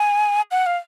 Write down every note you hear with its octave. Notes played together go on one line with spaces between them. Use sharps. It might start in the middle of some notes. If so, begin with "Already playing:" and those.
Already playing: G#5
F#5
F5